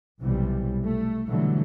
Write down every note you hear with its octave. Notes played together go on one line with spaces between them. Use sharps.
B1 C3 E3 G3
A3
B2 D3 E3 F#3 G3 A3